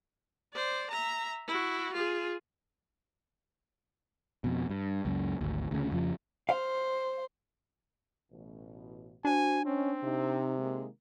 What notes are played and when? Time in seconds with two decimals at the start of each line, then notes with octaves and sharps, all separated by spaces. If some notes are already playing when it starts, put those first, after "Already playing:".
0.53 C5 D5
0.91 E5 A#5
1.47 E4 F#4
1.94 F4 G#4
4.44 F2 B2
4.70 G2
5.05 C#2 F#2
5.41 G#1 D2
5.71 D2 C#3
5.92 F2 C#3 F3
6.49 C5 F5
8.31 A1 B2
9.25 D4 F#4 C5 G#5
9.65 C4 C#4 D#4
10.04 C3 D#4
10.58 D#3 G#3 A#3